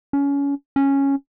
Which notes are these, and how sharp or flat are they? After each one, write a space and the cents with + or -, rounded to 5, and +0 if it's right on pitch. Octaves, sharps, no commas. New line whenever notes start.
C#4 +25
C#4 -5